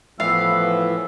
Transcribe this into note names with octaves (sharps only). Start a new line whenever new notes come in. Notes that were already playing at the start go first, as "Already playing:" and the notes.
A2 E3 F3 B3 E5 F5